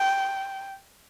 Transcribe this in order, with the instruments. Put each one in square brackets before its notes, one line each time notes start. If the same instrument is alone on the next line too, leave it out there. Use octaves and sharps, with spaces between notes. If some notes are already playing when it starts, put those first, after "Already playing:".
Already playing: [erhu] G5